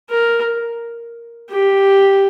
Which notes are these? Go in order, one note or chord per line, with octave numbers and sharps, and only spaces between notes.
A#4
G4